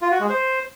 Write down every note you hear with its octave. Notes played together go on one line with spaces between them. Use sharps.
F4
F#4
G#3
C5